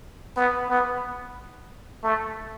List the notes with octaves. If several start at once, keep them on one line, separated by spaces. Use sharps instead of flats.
B3
B3
A3